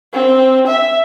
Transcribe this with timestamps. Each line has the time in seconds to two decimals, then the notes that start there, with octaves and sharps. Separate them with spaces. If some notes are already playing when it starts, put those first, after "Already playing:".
0.13 C4
0.67 E5